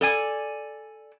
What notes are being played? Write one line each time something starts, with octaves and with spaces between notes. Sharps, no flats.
A4 D5 G#5